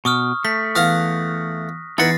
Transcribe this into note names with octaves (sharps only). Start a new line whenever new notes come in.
B2 C#6 D#6 F6
A3 B6
E2 F5 F#5 D#6 F#6 A#6
E2 D#4 E4 B4 F#5 A6 A#6 C7